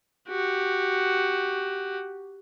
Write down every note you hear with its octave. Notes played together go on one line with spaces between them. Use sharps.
F#4 G4